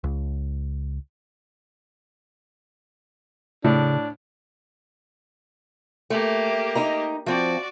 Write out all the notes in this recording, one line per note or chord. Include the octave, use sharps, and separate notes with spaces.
C#2
A2 C#3 D4
A3 A#3 G4
D#4 D#5 A#5
F3 C4 F#4 D5